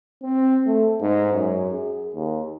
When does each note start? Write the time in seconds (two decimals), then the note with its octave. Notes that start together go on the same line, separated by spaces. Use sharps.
0.23 C4
0.66 A3
1.01 G#2
1.32 F#2
1.71 G#4
2.14 D#2